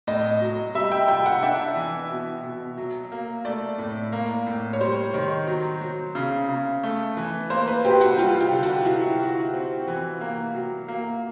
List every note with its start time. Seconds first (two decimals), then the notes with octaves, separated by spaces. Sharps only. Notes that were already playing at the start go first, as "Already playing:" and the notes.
0.07 A2 D#5
0.41 F#3
0.75 G3 E5
0.92 G5
1.08 F4 G5
1.26 F#5
1.42 D4 E5
1.76 E3
2.10 B2
2.43 B2
2.77 F#3
3.12 A#3
3.45 A3 D5
3.78 A2
4.12 A#3
4.46 A2
4.73 C#5
4.81 G3 C5
5.14 D#3
5.47 F#3
5.81 F#3
6.15 C#3
6.49 C#3
6.83 A3
7.17 E3
7.50 A#3 C5
7.68 B4
7.85 F#3 G4
8.01 F#4
8.18 G3 F4
8.41 G4
8.52 D3
8.63 F#4
8.85 F#3 E4
9.19 F#4
9.53 C4
9.87 E3
10.21 A#3
10.54 F#3
10.88 A#3